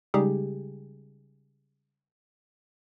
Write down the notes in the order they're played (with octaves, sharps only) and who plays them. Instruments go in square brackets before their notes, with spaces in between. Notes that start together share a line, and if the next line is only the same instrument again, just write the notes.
[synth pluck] C#3 G3 G#3 D#4 G4 G#4